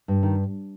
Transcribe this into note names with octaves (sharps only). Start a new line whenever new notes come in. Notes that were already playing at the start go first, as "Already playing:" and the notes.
G2
D#3